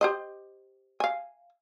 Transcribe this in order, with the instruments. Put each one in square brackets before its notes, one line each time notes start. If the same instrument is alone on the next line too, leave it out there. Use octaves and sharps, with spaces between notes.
[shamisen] G4 C5 D#5
F5 G#5